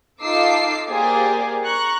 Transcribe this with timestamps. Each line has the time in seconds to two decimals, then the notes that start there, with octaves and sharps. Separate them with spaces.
0.21 D#4 F4 A4 D6 E6 C7
0.89 A#3 G4 G#4 C5 D5
1.64 A#5 C#6 F#6